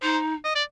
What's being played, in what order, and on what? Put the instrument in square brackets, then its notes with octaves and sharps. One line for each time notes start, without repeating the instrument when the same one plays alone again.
[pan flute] D#4 [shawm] C5
[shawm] D#5
D5